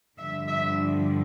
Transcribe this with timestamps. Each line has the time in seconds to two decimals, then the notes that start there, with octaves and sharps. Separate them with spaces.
0.18 G2 D3 F3 E5
0.48 E5